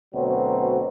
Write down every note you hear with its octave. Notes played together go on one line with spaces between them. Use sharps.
D2 B2 F#3 C4